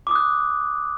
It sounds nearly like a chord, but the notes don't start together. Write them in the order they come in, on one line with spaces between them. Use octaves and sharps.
D6 D#6 F#6